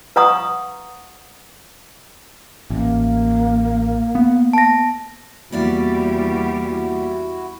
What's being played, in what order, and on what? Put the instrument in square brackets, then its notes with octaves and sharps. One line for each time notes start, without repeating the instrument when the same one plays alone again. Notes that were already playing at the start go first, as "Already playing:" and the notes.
[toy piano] B4 F5 F#5 A#5 C#6 D#6
[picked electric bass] A1 [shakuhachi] A#3
[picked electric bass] B3
[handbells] A5 A#6
[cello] E2 G3 [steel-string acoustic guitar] A#3 D5 E5 [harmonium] E4 F#4